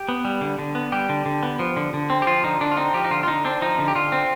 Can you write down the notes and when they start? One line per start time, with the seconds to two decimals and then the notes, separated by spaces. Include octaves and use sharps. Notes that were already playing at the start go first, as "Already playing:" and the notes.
Already playing: G4
0.08 B3
0.25 G3
0.41 D3
0.59 D3
0.75 B3
0.92 G3 G4
1.09 D3
1.26 D3
1.43 B3
1.59 F3
1.77 D3
1.94 D3
2.10 C4
2.22 G4
2.27 F3 F4
2.44 D3 D#4
2.61 D3 D4
2.71 F4
2.77 C4 D#4
2.94 F3 G4
3.04 D#4
3.11 D3 F4
3.23 F4
3.28 D3 D#4
3.45 C4 D4
3.62 F3 D#4
3.79 D3
3.88 G4
3.95 D3 F4
4.12 C4